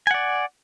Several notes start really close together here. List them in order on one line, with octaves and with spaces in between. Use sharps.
G#5 F#5 D5